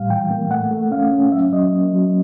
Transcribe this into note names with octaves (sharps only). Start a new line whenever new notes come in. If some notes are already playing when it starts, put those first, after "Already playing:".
Already playing: A2 G3 F5
E3 G5
A#3
A3 F#5
A3
C#4 F5
C#4
F#3 E5
F#3 D#5
A#3
F#3